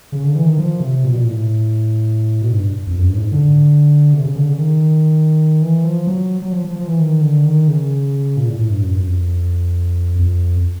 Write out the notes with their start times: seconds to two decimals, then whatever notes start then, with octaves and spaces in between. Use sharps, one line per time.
0.12 C#3
0.24 D3
0.36 E3
0.46 D#3
0.58 F3
0.80 C3
1.04 A#2
1.10 B2
1.18 A#2
1.26 A2
2.42 B2
2.50 G#2
2.56 G2
2.87 F2
2.99 F#2
3.09 G2
3.16 A2
3.21 G#2
3.32 D3
4.13 C3
4.25 C#3
4.35 D3
4.48 C#3
4.59 D#3
5.62 E3
5.84 F3
6.07 F#3
6.42 F#3
6.52 F3
6.64 F3
6.76 F3
6.87 E3
6.99 D#3
7.21 D3
7.45 D#3
7.68 C#3
8.37 A#2
8.47 A2
8.59 A2
8.70 G2
8.82 F#2
8.96 F#2
9.05 F2
10.19 F2